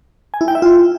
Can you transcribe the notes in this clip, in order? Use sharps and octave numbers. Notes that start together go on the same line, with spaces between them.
G#5
E4
G5
E5
F4